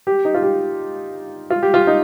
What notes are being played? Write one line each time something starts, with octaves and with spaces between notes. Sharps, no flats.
G4
D#4
F4
G4
F4
G4
F4
D#4